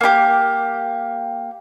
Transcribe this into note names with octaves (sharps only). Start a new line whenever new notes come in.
A#3 D#4 G4